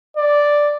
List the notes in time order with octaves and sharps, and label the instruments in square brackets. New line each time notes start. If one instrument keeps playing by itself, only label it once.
[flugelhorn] D5